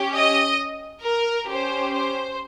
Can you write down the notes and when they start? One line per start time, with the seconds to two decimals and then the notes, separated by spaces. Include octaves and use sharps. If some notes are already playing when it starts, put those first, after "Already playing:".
Already playing: C#4 G4
0.14 D#5
1.04 A#4
1.49 C#4 G4 C5
1.95 C5